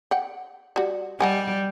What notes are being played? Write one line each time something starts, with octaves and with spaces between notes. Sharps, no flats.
F#5 G5
G3 F#4
G3 D#5 F#5 G#5